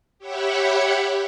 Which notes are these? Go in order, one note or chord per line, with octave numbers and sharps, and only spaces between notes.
G4 C#5 E5 F#5 B5 C#6